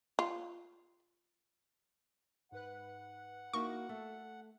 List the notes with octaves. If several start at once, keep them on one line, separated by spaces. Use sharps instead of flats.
F4
G#2 B4 F#5 F#6
A#3 D#4 E4 F#4 C#6 A#6
A3 A4